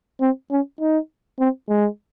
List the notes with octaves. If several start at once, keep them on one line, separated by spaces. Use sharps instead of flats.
C4
C#4
D#4
C4
G#3